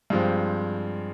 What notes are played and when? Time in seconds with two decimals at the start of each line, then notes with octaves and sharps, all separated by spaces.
0.10 G2 F3 G#3 C4